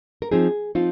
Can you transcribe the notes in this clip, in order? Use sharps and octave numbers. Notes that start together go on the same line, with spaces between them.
A#4
F3 C4 D#4 G#4
F3 C4 D#4 F4